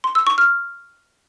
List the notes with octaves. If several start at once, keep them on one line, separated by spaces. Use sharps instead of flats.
C6
E6
C#6
F6